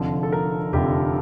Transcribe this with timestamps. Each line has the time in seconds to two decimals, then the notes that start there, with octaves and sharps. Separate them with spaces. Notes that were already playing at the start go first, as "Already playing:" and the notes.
Already playing: F1 F2 D3 F3
0.23 A4
0.32 A#4
0.73 F1 F2 D3 F3 G4